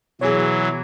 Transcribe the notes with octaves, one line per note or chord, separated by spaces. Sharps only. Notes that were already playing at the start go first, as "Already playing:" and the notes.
B2 E3 F#3 G#4 C#5